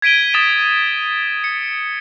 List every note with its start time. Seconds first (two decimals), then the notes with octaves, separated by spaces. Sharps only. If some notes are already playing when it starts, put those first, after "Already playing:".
0.02 G#6 B6 D7 D#7 G7
0.34 D#6 A6 D#7 E7
1.44 C#7